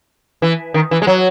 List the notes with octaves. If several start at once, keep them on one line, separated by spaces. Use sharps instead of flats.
E3
D#3
E3
G#3
F#3